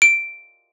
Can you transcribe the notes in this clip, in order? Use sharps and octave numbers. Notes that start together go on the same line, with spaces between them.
D7